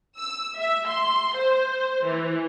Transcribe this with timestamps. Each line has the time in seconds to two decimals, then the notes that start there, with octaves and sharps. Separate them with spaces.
0.17 E6
0.58 E5
0.87 C6
1.37 C5
2.07 E3